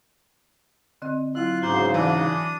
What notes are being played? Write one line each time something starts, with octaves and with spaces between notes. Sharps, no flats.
D3 C4 D#5
F#3 E4 F4 F#6
G#2 C#3 F#4 C5 A#5 C6 D6
E3 D4 D5 A5 D#6 E6